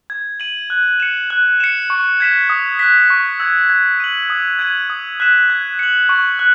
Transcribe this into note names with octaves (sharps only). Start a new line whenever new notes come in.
G#6
D#7 F#7
F#6
C#7 E7
F#6
C#7 E7
C#6
G#6 B6 E7
D#6
F#6 B6
C#6
E6 G#6
G#6
D#7 F#7
D#6
G#6 D#7 F#7
D#6
F#6 B6 E7
G#6
C#7 F#7
C#6
F#6